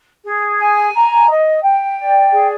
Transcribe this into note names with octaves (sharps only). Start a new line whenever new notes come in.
G#4
G#5
A#5
D#5
G5
D5
G#4